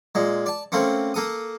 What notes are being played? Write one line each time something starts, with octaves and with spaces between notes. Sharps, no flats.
A#2 G#3
D5 A5
A3 A#3 C4 C#4
A#3 A4 D#6